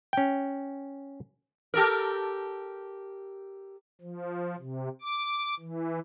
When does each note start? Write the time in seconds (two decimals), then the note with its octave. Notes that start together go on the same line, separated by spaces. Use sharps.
0.13 C#4 G5
1.74 G4 A4 A#4
4.01 F3
4.59 C3
5.02 D6
5.60 E3